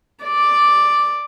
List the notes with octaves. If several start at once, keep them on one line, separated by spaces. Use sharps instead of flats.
D5